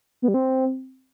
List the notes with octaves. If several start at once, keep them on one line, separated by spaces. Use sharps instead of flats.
B3
G3
C4